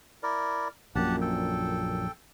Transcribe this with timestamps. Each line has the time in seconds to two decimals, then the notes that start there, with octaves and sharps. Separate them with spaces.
0.23 E4 A#4 D5
0.95 A#1 F#2 A#2 G4 F#5 A5
1.21 A4 G5